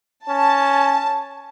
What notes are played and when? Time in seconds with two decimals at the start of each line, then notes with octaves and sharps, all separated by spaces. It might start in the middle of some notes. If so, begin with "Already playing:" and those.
0.29 C#4 A5